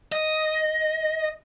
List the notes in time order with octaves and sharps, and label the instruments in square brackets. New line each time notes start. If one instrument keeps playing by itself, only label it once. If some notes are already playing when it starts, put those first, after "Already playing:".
[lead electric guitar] D#5